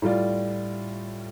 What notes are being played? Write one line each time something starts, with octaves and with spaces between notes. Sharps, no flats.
A2 G3 F4 D5